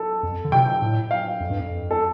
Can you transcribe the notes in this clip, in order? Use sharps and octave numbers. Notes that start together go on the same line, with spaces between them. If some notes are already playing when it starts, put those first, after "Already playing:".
Already playing: A4
F2
D3
C3 G5
A2
F5
F2
G2
F2
A4